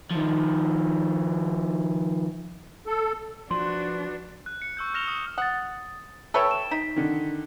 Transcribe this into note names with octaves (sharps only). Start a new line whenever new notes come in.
D#3 F3
A4
F3 D4 F#4 B4 C6
F#6
C#7
C#6 E6 G6
C#6 F6 A#6 E7 F7 G7
D#6
F#5 D#6 A6
A4 B4 C#5 E5 G5 A5 E6
E7
D#4 B6
D3 D#3